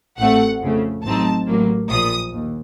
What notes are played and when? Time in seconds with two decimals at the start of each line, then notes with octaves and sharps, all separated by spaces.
0.19 A1 A2 A3 C4 F#5
0.62 F2 C#3 A3
1.05 A1 A2 F#3 C4 D#4 A5
1.47 A1 A2 F#3 A#3
1.90 A#1 A#2 F3 D#6
2.33 D#2